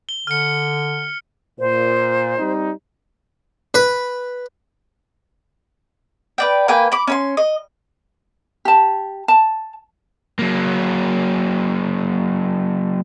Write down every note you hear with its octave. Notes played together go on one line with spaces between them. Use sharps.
G7
D3 F6 C#7
A#2 C5
G3 C4 D#4
B4
B4 D5 G5
A#3 B4 G5 G#5
B5 D6
C#4 B5 C6
D#5
G4 A5
A5
F#3 A#3